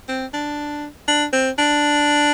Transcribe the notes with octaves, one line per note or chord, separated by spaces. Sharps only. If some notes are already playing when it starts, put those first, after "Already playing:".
C4
D4
D4
C4
D4